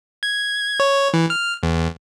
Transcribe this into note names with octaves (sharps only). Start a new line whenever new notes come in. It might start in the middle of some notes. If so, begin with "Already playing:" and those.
G#6
C#5
E3
F6
E2